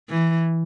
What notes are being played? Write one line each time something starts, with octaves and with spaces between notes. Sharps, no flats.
E3